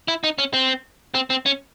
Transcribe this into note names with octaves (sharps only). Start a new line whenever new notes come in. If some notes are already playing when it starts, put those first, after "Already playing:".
E4
D#4
C#4
C4
C4
C4
C#4